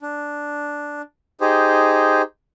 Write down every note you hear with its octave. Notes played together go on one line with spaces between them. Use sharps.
D4
D#4 G4 G#4 C5